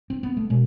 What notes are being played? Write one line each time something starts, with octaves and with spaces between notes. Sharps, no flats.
C4
B3
A3
B2 G#3